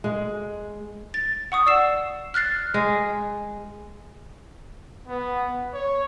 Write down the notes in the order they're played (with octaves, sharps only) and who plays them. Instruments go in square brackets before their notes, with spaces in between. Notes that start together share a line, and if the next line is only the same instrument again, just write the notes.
[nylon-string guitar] G#3
[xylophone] A6
F#5 C#6 D#6
D5 E6 C7 E7
F6 F#6 A6 C7
[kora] G#3
[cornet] B3
C#5